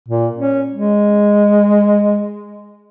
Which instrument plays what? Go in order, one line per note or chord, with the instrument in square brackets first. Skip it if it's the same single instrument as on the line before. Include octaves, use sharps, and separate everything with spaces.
[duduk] A#2
C#4
G#3